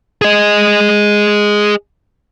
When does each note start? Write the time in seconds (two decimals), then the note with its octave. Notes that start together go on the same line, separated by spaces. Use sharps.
0.22 G#4 D#5